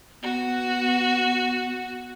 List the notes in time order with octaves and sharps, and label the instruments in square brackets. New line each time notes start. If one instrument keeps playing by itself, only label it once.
[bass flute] B3 [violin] F#4